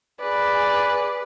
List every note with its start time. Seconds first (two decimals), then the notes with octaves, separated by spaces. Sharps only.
0.21 G#4 B4 D5